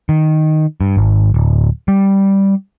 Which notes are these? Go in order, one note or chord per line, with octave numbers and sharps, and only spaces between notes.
D#3
G2
G#1
D1
G3